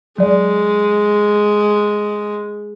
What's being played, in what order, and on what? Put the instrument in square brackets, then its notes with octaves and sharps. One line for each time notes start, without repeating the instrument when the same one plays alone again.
[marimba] F#3 D5 [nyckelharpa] G#3